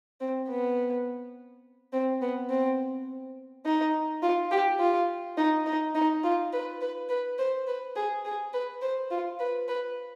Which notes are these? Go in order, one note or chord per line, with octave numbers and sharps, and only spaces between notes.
C4
B3
C4
B3
C4
D#4
F4
G4
F4
D#4
D#4
D#4
F4
B4
B4
B4
C5
B4
G#4
G#4
B4
C5
F4
B4
B4